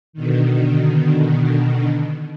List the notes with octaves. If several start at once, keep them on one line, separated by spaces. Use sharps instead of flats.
B2 D3 D#3